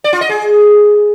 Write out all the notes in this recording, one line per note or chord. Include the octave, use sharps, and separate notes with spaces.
D5
F4
D#5
G#4